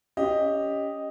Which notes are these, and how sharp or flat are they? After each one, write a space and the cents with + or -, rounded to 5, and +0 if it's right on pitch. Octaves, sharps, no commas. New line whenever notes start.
C#4 +20 G4 +10 D#5 +0